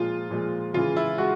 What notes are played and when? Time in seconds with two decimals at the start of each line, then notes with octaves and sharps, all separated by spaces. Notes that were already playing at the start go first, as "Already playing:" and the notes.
Already playing: A#2 F3 G#3 F4
0.31 A#2 F3 G#3
0.74 C#3 E3 G#3 F4
0.96 E4
1.18 G#3 F#4